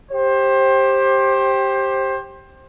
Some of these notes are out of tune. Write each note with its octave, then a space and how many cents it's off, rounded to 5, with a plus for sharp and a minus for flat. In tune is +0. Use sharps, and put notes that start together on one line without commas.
G4 +0 C5 +25